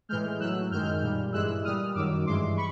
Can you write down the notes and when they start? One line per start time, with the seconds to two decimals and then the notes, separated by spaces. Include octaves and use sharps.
0.09 A2 E3 G#3 F6 G6
0.39 A2 F#3 E6 F#6
0.71 F#2 D#3 G#3 F6 G6
1.01 A#2 G3
1.32 G2 E3 G#3 E6 F#6
1.64 A#2 G3 D#6 F6
1.94 F#2 D#3 F#3 D6 E6
2.25 G2 E3 G#3 C6 D6
2.56 B5 C#6